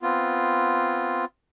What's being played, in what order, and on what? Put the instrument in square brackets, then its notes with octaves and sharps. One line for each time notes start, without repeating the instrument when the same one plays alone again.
[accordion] B3 C4 F4